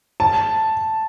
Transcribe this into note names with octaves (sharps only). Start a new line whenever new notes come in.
A5